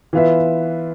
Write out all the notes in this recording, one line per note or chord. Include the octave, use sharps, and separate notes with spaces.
E3 B3 F4 B4 E5